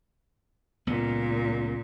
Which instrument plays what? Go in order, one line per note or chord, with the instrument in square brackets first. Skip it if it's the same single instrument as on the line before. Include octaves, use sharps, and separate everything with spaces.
[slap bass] C#2 B3 [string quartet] A#2